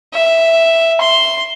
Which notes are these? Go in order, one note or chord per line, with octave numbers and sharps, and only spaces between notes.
E5
C6